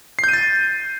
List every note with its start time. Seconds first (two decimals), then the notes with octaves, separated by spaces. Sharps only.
0.19 C7
0.24 G6
0.29 D#7
0.33 A6